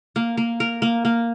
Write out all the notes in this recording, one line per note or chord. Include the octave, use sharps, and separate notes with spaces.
A#3
A#3
A#4
A#3
A#3